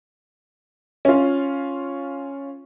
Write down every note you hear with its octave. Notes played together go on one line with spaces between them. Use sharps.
C#4 F4